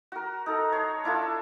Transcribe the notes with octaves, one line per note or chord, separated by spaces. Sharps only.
F#4 A#4
D#4 A4
C#5 D#5 C6
D4 E4 F4 A4